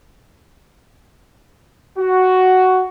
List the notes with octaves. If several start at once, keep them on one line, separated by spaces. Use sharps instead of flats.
F#4